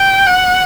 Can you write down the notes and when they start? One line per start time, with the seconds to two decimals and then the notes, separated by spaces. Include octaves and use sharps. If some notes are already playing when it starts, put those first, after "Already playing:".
Already playing: G5
0.27 F#5